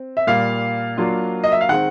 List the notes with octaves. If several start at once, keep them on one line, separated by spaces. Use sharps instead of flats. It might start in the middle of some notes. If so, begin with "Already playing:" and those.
Already playing: C4
E5
A#2 G3 A#3 F5
F#3 A#3 D4 F4
D#5
E5
F5
D#3 G#3 C4 F#5